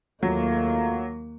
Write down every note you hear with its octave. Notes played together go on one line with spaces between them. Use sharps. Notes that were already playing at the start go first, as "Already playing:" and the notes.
D#2 G#2 F#3 A3 A#3 F4